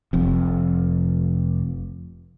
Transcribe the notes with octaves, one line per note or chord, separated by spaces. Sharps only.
F1 F2